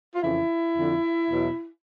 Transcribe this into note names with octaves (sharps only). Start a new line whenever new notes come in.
F4
F2 C#3 E3 E4
F2 D3 F3
E2 B2 F#3